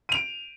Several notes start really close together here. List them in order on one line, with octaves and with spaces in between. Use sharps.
D#7 F7 D7